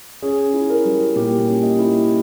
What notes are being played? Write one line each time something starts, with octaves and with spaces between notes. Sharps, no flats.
C#4 G#4
E4
A#4
G3
A#2 G4
C#4
D#5
E4